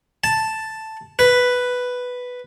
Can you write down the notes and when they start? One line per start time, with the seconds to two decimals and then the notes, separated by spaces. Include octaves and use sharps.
0.24 A5
1.19 B4